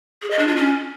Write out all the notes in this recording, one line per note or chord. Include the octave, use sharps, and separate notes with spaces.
G#4
D#5
D4
F4
C#4